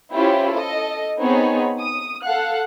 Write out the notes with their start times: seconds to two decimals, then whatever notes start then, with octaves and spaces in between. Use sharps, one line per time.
0.14 C#4 E4 F4 G4 C5 C#5
0.53 A4 D#5
1.20 B3 C4 D#4 G#4 C#5 B5
1.79 D#6
2.25 A4 F5 F#5 F#6